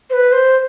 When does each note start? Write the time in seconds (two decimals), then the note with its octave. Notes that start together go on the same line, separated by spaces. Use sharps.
0.10 C5
0.13 B4
0.32 C5